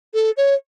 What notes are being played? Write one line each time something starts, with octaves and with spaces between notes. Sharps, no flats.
A4
C#5